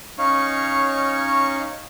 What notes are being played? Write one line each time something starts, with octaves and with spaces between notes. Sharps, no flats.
C#4 D#4 C#5 F5 C#6